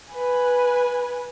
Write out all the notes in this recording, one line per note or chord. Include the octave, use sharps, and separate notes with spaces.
B4 G#5